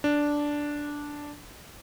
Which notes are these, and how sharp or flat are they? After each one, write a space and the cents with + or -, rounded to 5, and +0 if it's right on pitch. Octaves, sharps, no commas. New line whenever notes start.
D4 -5